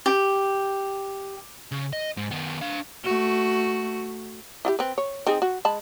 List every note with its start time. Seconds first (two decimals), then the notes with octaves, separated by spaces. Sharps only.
0.06 G4
1.72 C#3
1.93 D#5
2.17 G#2
2.31 D#3 B3
2.61 D4 F5
3.04 A3 F#4
4.65 E4 F#4 G4
4.79 C4 B4
4.98 C#5
5.27 C4 D#4 G#4
5.42 F#4
5.65 G#3 A5 B5